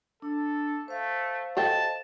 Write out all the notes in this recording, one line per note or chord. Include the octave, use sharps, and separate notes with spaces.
D4 A4
A3 C5 F5
A4 D#5 G5 A5